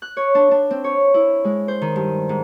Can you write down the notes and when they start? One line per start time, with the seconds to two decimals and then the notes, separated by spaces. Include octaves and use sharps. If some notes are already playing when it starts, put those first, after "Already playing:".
0.02 F#6
0.17 C#5
0.35 D4
0.51 D4
0.70 C4
0.84 C#5
1.14 E4
1.44 G#3
1.68 C5
1.81 D#3
1.96 G2
2.29 G#2